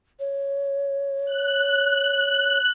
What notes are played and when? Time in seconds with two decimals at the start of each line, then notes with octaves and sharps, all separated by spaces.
0.20 C#5
1.25 F#6